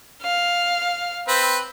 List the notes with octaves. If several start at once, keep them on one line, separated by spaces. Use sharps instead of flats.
F5
C4 B4